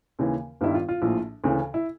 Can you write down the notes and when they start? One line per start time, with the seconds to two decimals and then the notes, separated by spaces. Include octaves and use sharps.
0.19 D#2 C#3 E3
0.61 G1 G2 D#3 G3 E4
0.74 F4
0.89 F4
1.02 A#1 A2 F3
1.44 D2 C#3 E3
1.74 E4